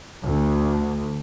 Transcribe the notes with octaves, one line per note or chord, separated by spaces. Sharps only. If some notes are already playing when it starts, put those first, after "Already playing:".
D2